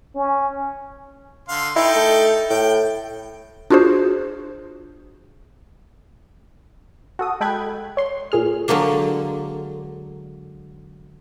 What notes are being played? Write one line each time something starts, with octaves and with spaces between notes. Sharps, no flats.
C#4
D3 F5 C6
D#4 E4 A4 G5
A3
A2 G5
D4 F4 F#4 G#4 C5
F#4 A4 D#6
G#3 A4 G5 B5 F#6 G#6
C#5 C6
A#2 G#4 F6
D3 F#3 G#3 A#3 D4